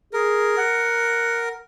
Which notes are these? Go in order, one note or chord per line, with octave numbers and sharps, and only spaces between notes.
G#4 A#4
F#5